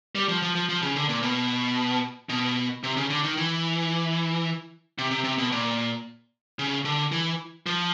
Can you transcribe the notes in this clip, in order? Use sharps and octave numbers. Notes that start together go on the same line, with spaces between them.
G3
F3
F3
F3
F3
C#3
D3
A#2
B2
B2
C3
C#3
D3
D#3
E3
C3
C3
C3
B2
A#2
C#3
D3
E3
F3